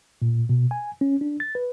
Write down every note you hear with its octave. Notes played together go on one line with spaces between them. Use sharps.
A#2
B2
G#5
C#4
D4
A6
B4